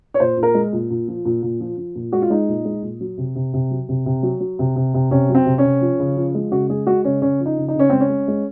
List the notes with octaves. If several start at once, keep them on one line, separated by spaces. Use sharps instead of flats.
C#5
A#2 C5
A#2
A#4
G#3
A#2
A#2
F3
A#2
A#2
F3
F3
A#2
G#3 F#4
F4
G#3 D#4
A#2
G#3
A#2
F#3
C3
C3
C3
F#3
C3
C3
F#3
F#3
C3
C3
C3
C3 C#4
F#3
C4
C3
C#4
C3
F3
C#3
F3
G#3
C#3 F#4
G#3 G#4
G#3 F#4
C#3 C#4
C#3 C#4
F3
D#4
C#3
D#4
C#3
C#4
G#3 C4
C#4
G#3
G#3